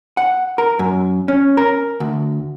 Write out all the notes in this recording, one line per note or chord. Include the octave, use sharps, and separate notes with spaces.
F#5
A#4
F#2
C#4
A#4
D2